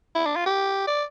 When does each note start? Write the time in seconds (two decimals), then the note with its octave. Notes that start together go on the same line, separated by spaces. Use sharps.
0.15 E4
0.26 D4
0.36 F4
0.46 G4
0.87 D5